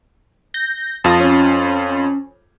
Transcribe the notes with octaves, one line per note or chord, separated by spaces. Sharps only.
G6 A#6
F2 F4 A5 D#6 A#6
C#4